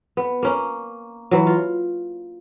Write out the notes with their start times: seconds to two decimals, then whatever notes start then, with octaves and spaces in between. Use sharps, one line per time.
0.17 B3
0.43 A#3 C#4
1.31 E3 F#3
1.47 F4